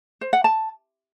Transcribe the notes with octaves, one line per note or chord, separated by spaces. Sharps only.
C5
F#5
A5